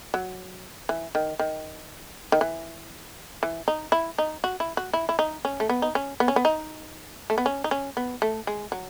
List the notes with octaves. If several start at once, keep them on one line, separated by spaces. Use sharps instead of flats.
F#3
E3
D#3
D#3
D#3
E3
E3
D#4
E4
D#4
F#4
E4
F#4
E4
E4
D#4
C#4
A3
B3
D#4
C#4
B3
C#4
B3
D#4
A3
B3
C#4
D#4
C#4
B3
A3
G#3
F#3